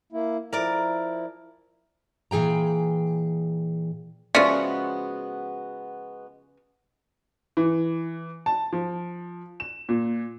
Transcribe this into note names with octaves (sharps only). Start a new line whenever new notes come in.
A#3 E4
F3 E4 A#4 D5
A#2 E3 G#4 G5 A#5
C#3 F3 G#3 B3 F#4 D5 E5 C#7
E3
A5
F3
E7
A#2